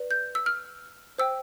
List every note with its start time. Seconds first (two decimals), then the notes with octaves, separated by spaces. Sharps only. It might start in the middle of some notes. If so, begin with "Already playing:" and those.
Already playing: B4 D5
0.11 G6
0.35 E6
0.46 F6
1.18 C5 G5 E6